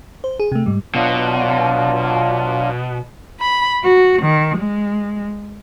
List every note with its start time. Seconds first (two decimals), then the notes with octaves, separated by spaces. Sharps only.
0.24 C5
0.40 G#4
0.52 C3 A3
0.66 G#2 G3
0.95 B2 F#3 D4 F4
3.41 B5
3.84 F#4
4.22 D#3
4.57 G#3